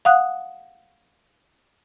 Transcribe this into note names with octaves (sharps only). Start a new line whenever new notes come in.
F5 F#5 D#6 F#6